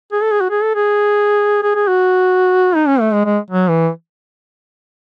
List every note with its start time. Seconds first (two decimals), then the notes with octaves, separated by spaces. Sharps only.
0.12 G#4
0.22 A4
0.31 G#4
0.41 F#4
0.50 G#4
0.63 A4
0.75 G#4
1.63 G#4
1.75 G#4
1.88 F#4
2.75 D#4
2.87 C#4
3.00 A3
3.13 G#3
3.25 G#3
3.50 F#3
3.69 E3